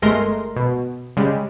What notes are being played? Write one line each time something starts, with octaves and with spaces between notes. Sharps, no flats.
G1 G#3 A3 A#4 C6 A#6
B2
C#3 G3 G#3